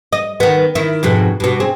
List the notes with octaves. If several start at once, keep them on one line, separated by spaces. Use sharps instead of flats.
D#5
D#3 B3
D#3 E4
F2 G#2 B2
G2 B2
C4 G#4